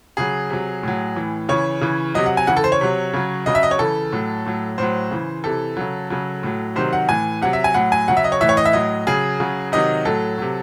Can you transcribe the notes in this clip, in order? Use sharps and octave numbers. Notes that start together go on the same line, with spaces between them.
C#3 F#3 G#4
C3 F#3
A2 F#3
A2 E3
C#3 E3 C#5
C#3 E3
C3 F#3 D#5
F#5
G#5
C#3 E3 F#5
A4
C5
C#5
C3 F#3
C#3 F#3
C#3 F#3 D#5
E5
D#5
C#5
C#3 E3 A4
A2 F#3
A2 F#3
A2 F#3 C5
C#3 E3
C3 E3 A4
C#3 F#3
C#3 F#3
A2 F#3
C3 D#3 F#3 C5
F#5
A2 E3 G#5
C3 F#3 F#5
E5
G#5
A2 F#3 F#5
G#5
C#3 F#3 F#5
E5
D#5
C#5
A2 E3 E5
C#5
D#5
E5
A2 F#3 D#5
C#3 F#3 G#4
C#3 F#3
C3 D#3 F#3 D#5
A2 F#3 A4
C3 F#3